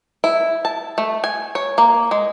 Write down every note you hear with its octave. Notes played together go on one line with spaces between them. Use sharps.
E4
A5
A3
G#5
C#5
A#3
G#3